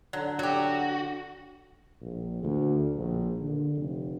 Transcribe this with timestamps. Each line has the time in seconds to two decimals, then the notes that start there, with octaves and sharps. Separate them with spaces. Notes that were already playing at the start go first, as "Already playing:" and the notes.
0.13 D3 F#3
0.39 F#3 F#4 G4 E5
2.01 A#1
2.43 D2
2.96 A#1
3.40 D3
3.76 F1